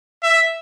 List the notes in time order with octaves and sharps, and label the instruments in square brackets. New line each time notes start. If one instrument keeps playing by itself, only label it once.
[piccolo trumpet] E5